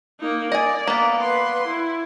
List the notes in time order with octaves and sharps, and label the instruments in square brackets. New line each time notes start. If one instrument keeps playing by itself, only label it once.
[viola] A#3 D#4
[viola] D5 [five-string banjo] D#5 G#5
[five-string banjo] A#3 B3
[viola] B4 C6
E4